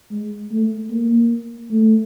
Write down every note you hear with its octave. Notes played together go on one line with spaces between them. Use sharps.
G#3
A3
A#3
A3